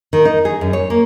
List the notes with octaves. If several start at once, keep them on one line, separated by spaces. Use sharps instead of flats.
D#3
D#4
G#4
F#2
C#5
A#3